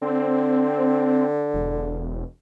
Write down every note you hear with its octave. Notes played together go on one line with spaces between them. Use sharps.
D3 C4
E1